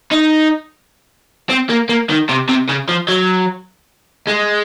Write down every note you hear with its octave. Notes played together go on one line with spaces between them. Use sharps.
D#4
C4
A#3
A#3
D#3
C3
C3
C#3
F3
F#3
G#3